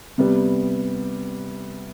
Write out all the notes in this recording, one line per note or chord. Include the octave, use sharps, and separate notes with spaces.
C3 G3 B3